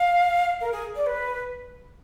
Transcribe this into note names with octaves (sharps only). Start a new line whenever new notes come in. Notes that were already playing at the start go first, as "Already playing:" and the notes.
Already playing: F5
A#4
G#4
D5
B4